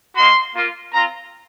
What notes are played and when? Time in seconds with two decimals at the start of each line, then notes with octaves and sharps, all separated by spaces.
0.15 A#3 D#4 F#4 C6
0.54 A#3 F4
0.92 C4 F4 A#5